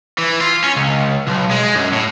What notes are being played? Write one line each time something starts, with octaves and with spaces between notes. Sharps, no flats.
E3
F4
C#4
C#2
B1
G#3
F#2
A2